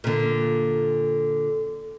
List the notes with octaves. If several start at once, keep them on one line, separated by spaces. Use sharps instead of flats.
A#2 D3